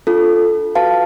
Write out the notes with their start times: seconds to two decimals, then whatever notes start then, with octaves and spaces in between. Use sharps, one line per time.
0.07 D4 F4 A4
0.75 F#4 B4 F5 A5